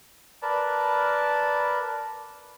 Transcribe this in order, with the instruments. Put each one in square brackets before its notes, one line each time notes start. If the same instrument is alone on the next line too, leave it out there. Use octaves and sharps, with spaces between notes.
[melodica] A#4 B4 D5 A5